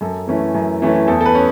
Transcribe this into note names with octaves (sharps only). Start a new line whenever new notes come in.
F#2 A4
E3 A3 C#4
F#2
E3 A3 C#4
E2 A4
A4
B4
C#4